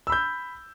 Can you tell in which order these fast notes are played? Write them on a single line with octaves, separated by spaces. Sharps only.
E6 B5 G6